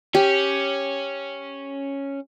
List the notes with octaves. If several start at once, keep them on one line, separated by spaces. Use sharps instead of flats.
C#4 G4